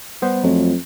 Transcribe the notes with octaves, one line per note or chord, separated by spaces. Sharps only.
G3 B3 C5
F2 F#3 A3 F4